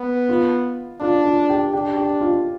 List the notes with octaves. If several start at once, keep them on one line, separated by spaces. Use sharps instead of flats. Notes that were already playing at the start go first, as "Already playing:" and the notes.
Already playing: B3
F4
D4 F4
F4
G4
D4 G4
G4
F4